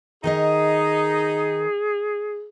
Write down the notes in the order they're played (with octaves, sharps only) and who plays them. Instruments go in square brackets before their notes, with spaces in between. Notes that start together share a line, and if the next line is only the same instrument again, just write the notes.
[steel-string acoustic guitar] D#3 A#4 D#5 [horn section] D#4 [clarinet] G#4